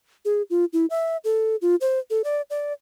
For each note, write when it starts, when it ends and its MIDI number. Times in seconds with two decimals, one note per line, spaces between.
0.25 0.42 68
0.50 0.65 65
0.73 0.86 64
0.90 1.17 76
1.24 1.56 69
1.62 1.75 65
1.81 1.99 72
2.10 2.22 69
2.24 2.41 74
2.50 2.73 74